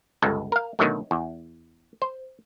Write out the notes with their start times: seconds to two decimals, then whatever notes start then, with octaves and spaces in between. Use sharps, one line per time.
0.22 G1 C#2 G#3 A4
0.52 A#4 F5
0.79 B2 D3 D#3 F#3 A3
1.11 E2
2.02 C5